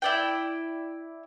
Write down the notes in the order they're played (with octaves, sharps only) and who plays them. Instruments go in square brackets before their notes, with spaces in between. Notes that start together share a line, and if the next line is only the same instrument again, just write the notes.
[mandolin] E4 D5 G5